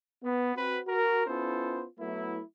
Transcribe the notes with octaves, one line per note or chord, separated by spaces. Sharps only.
B3
C4 F#4 B4
F#4 A#4
B3 C#4 E4 F4 A4 C5
F#3 A3 B3 E4